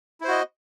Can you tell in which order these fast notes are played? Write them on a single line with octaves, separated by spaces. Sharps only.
E4 C5 F#4 D#5